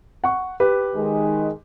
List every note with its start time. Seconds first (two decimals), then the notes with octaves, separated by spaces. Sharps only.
0.24 F#5 C#6
0.60 G4 B4
0.95 D#3 G#3